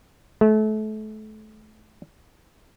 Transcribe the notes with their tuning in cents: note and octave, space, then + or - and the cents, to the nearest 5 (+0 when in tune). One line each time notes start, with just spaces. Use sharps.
A3 -30